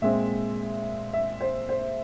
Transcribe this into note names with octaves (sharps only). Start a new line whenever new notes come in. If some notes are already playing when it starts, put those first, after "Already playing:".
A#2 G#3 C4 E5
E5
C5
C5